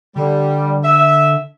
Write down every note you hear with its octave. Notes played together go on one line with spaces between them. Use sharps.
D3 G3
E5